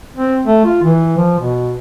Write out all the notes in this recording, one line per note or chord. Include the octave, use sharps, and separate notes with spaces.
C4
A3
F4
E3
F3
B2